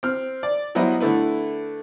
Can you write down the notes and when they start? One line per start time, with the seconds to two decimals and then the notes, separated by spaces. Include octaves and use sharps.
0.03 C4 F6
0.43 D5
0.75 F#3 G3 B3 E4 C5 D#5
1.00 D3 A3 E4 B4